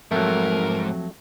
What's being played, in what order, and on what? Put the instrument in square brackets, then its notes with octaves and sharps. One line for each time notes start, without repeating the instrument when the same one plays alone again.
[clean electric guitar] F2 F#3 [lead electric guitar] G#2 [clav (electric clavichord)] A3 [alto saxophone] A#4